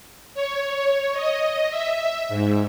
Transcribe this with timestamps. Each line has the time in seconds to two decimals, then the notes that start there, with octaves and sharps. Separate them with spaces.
0.34 C#5
1.13 D#5
1.70 E5
2.29 G#2